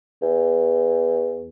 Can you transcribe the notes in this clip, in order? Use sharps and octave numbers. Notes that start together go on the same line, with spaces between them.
E2